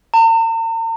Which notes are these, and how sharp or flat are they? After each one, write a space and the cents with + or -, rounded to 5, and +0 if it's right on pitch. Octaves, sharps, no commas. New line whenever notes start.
A#5 -45